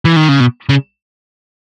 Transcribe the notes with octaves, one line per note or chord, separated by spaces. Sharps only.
E3
D#3
C#3
B2
C#3